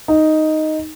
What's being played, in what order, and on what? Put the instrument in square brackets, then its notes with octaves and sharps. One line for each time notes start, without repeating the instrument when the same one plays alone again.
[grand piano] D#4